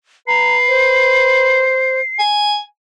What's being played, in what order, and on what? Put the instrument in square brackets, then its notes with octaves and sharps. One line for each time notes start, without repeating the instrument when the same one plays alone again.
[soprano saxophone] B4 [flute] A#5 [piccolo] C7
[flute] C5
[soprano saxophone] G#5